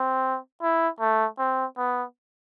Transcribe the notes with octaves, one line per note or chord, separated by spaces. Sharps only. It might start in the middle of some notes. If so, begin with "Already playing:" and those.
Already playing: C4
E4
A3
C4
B3